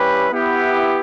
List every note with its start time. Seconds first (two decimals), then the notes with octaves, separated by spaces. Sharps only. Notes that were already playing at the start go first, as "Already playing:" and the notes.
Already playing: G3 C#4 E4 G4 B4
0.32 B3 E4 G4